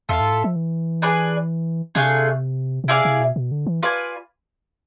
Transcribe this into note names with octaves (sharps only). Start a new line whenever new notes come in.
E2 F4 A4 E5
G#2
A2
F3
E3
D4 G#4 B4 D5
C3 A3 D4 F4 G#4
B2
C3 E4 G#4 D5 F5
C3
B2
B2
D3
E3
F4 B4 D5 G#5